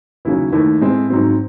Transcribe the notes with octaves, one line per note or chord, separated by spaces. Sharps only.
D#2 C#3 F#3 C#4 E4
D#2 D#3 A3 E4
A2 G#3 C4
G#2 F#3 C4